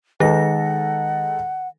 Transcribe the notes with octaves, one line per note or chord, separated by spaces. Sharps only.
D#3 G#3 D#4 A4 F#5 A#6